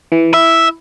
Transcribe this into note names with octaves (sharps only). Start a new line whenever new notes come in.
E3
E4 E5